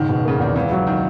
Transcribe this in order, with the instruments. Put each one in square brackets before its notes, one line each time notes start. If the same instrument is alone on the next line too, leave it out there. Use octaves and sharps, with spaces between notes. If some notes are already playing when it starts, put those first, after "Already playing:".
Already playing: [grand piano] F#1 G#2 [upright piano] D#3
[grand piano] B2
[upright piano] C#3 [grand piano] A#3
[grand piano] E2 [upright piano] D#3
[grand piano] C#2 [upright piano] E3
[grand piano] F#3
[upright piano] D#3